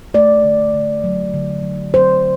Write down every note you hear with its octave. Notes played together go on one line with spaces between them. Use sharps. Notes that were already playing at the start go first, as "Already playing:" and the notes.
A3 D5
D3
D3
F#3
D3
F#3
F#3 C5